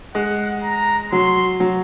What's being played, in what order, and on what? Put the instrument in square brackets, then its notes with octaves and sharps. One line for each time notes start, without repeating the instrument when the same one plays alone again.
[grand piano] G#3 [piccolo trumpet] F#5
[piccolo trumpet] A#5
[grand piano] F#3 [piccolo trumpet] C6
[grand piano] F#3